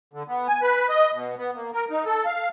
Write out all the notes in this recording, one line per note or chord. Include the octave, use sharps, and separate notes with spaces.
D3
B3
G#5
B4
D#5
B2
B3
A#3
A#4
D#4
A4
F5